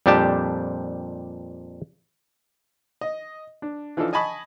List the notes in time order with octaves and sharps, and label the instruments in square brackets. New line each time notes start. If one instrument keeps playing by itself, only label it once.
[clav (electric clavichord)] F2 A#2 G3 D4 G4 A5
[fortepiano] D#5
D4
E3 F3 D4 D#4 A4
D#5 G#5 A5 B5 C#6 D#6